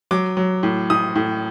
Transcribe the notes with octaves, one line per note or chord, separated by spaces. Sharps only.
F#3 D6
F#3
A2
A2 D#6
A2